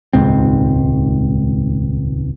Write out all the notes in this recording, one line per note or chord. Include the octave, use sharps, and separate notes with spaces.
D#1 C#2 G#2 C4